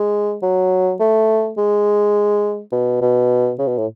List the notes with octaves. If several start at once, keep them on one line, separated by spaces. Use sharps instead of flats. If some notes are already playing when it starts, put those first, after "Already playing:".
Already playing: G#3
F#3
A3
G#3
B2
B2
C#3
B2
A2